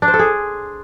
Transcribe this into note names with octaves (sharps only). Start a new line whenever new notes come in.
D4
C5
A4
G#4